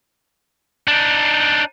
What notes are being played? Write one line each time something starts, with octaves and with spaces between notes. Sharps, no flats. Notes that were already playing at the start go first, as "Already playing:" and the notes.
D4 D#4